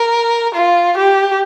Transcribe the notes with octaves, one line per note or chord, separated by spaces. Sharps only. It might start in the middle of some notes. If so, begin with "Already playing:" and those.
Already playing: A#4
F4
G4